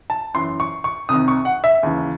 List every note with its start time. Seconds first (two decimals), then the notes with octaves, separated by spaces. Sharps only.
0.10 A5
0.34 F#2 E3 C6
0.60 C#6
0.84 C#6
1.09 C2 C3 D#3 D#6
1.28 C#6
1.45 F#5
1.64 E5
1.83 D#2 C#3 E3